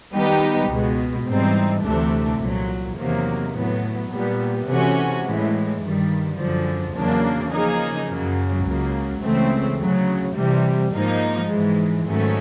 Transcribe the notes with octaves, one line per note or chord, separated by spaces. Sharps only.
D#3 G3 B3 D#4 G4
C#2 B2 G#3
G#2 E3 G3 C4 D#4
D2 C3 E3 A3 D4
C2 A#2 F#3
E2 C3 D#3 F#3 A#3
A2 F#3 B3
A#2 G3 B3
C3 E3 A3 C#4 F#4
A2 E3 G#3
G2 D#3 G3
F#2 D3 F3
E2 C#3 F#3 A#3 D4
C#3 F3 A#3 D#4 G#4
F#2 C#3 F#3 A#3
C#2 C#3 F#3 A#3
C#2 C#3 E3 A3 C4
D2 C#3 F#3
C3 E3 G3
G#2 F3 A#3 D#4
G#2 E3 G#3
G#2 D#3 F#3 A3 C#4